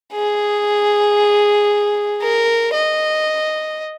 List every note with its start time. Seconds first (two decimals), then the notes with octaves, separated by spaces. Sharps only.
0.13 G#4
2.22 A#4
2.74 D#5